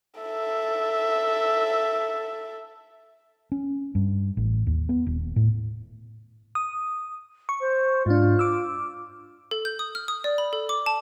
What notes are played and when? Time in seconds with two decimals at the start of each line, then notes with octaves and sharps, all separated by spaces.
0.20 A4 E5
3.52 C#4
3.95 G2
4.37 A1
4.67 D#2
4.89 B3
5.07 D#1
5.36 A2
6.55 D#6
7.49 C#6
7.60 C5
8.06 G#2 D4 F4
8.39 D6 E6
9.51 A4
9.65 G6
9.79 D#6
9.95 F6
10.08 D#6
10.24 D5
10.38 B5
10.53 A4
10.69 D6
10.86 A5